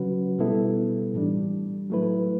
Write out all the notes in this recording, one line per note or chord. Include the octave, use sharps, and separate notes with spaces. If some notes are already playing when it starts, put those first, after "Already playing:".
Already playing: C#3 F#3 C#4 F#4 B4
B2 G3 B3 E4 A4
A2 E3 G3 D4
F#3 A3 E4 B4